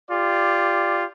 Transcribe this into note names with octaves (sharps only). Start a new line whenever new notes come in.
F4 G4 D5